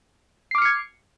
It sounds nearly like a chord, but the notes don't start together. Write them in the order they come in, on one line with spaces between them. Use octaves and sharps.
C7 D6 F6 C#7 G#6